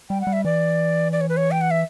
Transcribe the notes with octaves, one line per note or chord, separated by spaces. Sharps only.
G3 G5
F#5
G3
E5
E3 D5
D5
C#5
B4
C#5
G5
F#5
E5